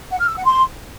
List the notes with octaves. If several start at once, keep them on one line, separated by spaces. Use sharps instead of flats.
F#5
F6
E6
F#5
C6